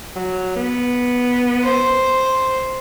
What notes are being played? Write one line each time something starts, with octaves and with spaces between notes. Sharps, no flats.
F#3
B3
C5